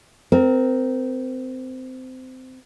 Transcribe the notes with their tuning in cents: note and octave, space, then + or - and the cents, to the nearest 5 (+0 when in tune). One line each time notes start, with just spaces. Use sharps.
C4 -20 A#4 +0